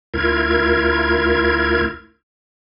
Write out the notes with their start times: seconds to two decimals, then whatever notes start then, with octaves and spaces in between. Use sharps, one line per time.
0.14 D2 E4 F4 A#4 G#6